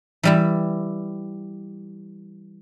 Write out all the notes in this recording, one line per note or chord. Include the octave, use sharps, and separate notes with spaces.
E3 G3 E4